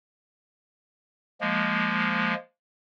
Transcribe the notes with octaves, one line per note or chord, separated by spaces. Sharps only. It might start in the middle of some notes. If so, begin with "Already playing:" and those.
F3 G#3 A#3